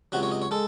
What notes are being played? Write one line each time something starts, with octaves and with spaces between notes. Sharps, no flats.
C#2 C3 F#3 F#4
C#5
D#5
C#5
G#3 A4